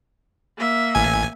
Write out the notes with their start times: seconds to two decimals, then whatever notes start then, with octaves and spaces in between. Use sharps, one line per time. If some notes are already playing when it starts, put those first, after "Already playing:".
0.58 A#3 E5
0.95 A1 G#5